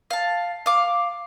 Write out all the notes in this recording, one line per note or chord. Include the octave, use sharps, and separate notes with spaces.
F5 A5
F5 D6